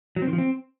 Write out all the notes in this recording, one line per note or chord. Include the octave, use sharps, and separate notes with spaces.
F#3
C4
D#3
F3
C4